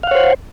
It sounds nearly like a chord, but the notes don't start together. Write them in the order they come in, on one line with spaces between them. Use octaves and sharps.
F5 F#5 C#5 C5